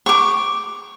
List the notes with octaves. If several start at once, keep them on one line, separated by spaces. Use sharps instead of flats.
C#6 D6